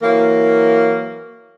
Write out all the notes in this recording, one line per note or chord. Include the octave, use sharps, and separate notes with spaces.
E3 F#3 A#3